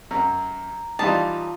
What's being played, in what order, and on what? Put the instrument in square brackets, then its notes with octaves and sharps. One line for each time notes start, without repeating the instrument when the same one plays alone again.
[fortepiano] F#2 [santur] A#5
[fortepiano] E3 G3 D#4 [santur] F4 D#6 [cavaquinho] A5